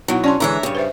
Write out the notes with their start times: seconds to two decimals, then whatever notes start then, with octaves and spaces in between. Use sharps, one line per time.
0.08 B2 F#3 D#4 E4 F#5
0.24 C#4 D5 A5 C6
0.40 D3 E3 G#3 C#5 E5 A#5
0.63 G2 C#3 G4 C#5
0.75 B4 C5 E5